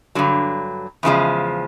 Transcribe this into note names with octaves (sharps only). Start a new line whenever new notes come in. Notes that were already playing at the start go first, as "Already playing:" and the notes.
G2 D3 F#3
E2 C#3 F3 G#3